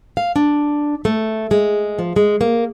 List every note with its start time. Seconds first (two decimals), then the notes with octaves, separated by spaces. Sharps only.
0.17 F5
0.36 D4
1.05 A3
1.51 G#3
1.99 F3
2.16 G#3
2.41 A#3